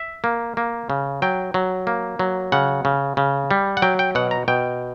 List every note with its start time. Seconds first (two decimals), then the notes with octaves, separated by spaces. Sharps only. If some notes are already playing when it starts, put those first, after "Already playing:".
Already playing: E5
0.24 A#3
0.57 A#3
0.90 C#3
1.22 F#3 G5
1.54 F#3
1.87 A#3
2.19 F#3
2.52 C#3 F#5
2.85 C#3
3.17 C#3
3.51 G3
3.77 F#5
3.82 F#3 G5
3.99 G5
4.15 B2 F#5
4.31 A#5
4.48 B2 G5